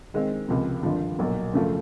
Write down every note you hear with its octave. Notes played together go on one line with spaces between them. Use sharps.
D#3 G#3 C4
C#2 C3 F3 A#3
G#1 G2 D3 F3
B1 A#2 F#3
F#2 C#3 F3 A3